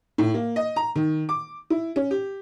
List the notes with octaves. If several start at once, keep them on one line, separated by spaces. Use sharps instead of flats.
A2
A#3
D#5
A#5
D#3
D6
E4
C#4
G4